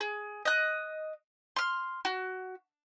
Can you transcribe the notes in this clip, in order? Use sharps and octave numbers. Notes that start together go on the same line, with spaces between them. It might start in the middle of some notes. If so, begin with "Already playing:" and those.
G#4
D#5 F#6
C6 F6
F#4